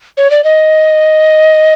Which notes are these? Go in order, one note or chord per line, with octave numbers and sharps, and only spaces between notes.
C#5
D5
D#5